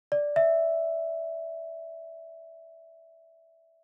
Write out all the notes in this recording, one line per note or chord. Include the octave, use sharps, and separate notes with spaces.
D5
E5